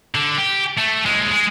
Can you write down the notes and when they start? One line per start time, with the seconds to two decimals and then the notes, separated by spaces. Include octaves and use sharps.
0.15 D3
0.38 G4
0.78 A3
1.05 D#2 G#3
1.32 G#3